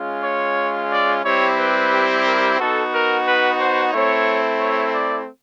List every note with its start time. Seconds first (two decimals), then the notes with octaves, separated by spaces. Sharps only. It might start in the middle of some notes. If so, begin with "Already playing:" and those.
Already playing: G#3 C#4 F4
0.24 C#5
0.91 D5
1.24 G3 C4 E4 G4 C#5
1.58 B4
2.26 A#4
2.58 B3 D#4 F#4 A4
2.92 A#4
3.26 B4
3.60 C5
3.92 A3 C4 E4 C#5
4.60 C#5
4.94 D5